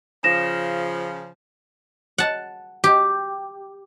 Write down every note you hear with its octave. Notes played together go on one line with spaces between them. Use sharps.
C#3 F3 A#6 E7
F#5 A5
G4